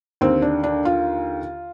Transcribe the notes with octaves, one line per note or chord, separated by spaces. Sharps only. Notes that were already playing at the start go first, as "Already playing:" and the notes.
D#2 D3 C4
D4
D4
F4